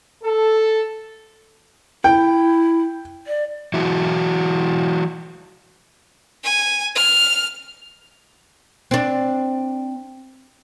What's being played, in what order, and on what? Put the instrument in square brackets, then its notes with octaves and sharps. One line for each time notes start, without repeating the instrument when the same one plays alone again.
[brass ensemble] A4
[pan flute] E4 [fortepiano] G5
[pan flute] D5
[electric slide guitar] E3 F#3 E4 F#4
[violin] G#5
F6
[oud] C4 D4